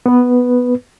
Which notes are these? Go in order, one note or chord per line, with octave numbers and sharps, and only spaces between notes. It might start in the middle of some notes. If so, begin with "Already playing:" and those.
B3 B4